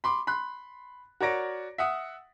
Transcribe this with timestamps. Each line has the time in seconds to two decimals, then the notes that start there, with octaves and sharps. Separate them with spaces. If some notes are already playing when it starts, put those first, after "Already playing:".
0.04 B5 C6 D6
0.27 B5 C6 F#6
1.20 F#4 A#4 C#5 D5 A#6 D7
1.78 E5 F#5 D#6